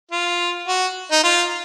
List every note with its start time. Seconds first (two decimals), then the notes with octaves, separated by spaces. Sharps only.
0.12 F4
0.68 F#4
1.12 D#4
1.24 F4